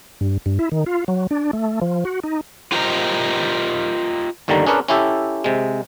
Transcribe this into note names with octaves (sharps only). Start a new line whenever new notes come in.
G2
G2
E4
D#3
F4
F#3
D4
A3
F3
F#4
D#4
F4 G4 A#4 C5 D#5 A#5
G1 D#2 D3 D#3 G3 A#5
C#4 D4 G#4 A#4 B4 C#5
C#4 E4 G4 A4
C3 G#3